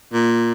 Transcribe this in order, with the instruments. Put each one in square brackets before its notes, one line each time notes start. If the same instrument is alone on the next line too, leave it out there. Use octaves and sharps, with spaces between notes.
[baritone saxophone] A#2